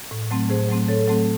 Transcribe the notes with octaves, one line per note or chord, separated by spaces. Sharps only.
A2
F#3 A3 C4
A2 G#4 C5
F#3 A3 C4
A2 A4 C#5
F#3 A3 C4